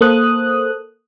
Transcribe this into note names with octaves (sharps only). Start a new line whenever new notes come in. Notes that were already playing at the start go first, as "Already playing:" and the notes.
A#3 A4 C5 D#6 F#6